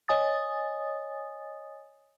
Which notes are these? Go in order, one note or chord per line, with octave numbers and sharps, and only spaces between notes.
C#5 D#5 G#5 D#6 A6